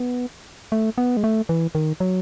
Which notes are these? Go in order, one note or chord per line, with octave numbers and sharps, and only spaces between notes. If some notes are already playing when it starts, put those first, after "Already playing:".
Already playing: B3
A3
B3
G#3
A3
E3
D#3
F#3